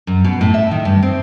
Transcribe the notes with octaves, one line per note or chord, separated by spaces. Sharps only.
F#2
B2
A2
E5
D#3
G2
C4